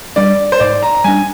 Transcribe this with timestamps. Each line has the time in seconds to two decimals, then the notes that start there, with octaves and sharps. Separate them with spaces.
0.16 G3 D4 D5
0.52 C5
0.60 G#2 D5
0.83 A#5
0.95 A#5
1.04 G3 D4 G#5